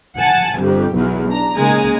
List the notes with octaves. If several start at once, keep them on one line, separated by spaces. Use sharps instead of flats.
F#5 G#5 A5
G1 F2 G4
B1 E2 F#3
D4 A#5
C#3 G#3 A#3 D#4 G#5 A#5